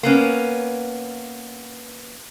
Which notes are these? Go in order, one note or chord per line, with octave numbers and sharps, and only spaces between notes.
A#3 B3 C#4